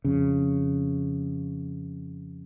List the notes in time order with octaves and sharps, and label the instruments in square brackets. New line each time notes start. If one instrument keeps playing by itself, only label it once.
[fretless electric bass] F2 C#3